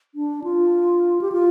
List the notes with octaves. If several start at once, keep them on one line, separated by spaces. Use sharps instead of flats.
D4
F4
G4
F4